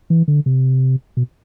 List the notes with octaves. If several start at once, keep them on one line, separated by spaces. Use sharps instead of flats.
E3
D3
C3
B2